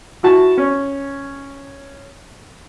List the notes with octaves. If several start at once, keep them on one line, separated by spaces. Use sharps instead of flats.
E4 F#4 A5
C#4